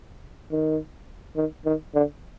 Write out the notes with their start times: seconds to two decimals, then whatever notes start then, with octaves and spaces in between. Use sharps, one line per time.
0.51 D#3
1.36 D#3
1.65 D#3
1.94 D3